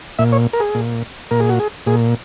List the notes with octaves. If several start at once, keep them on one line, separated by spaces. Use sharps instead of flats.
A#2 E5
C#5
A#4
G#4
A#2
A#2 A#4
G#4
F#4
G#4
A#2 G#4